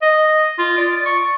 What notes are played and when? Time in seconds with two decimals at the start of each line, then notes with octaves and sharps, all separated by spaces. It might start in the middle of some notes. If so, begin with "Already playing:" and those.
0.02 D#5
0.58 F4
0.78 D5
1.05 C#6